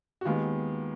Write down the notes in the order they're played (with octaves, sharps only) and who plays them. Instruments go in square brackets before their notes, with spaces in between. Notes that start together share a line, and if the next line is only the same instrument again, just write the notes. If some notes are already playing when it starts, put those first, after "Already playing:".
[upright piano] F#4
D#2 D#3 G#3 B3 F4